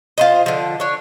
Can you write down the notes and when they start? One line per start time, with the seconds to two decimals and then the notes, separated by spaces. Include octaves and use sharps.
0.18 F4 C5 D#5
0.46 D3 F3
0.80 D4 C#5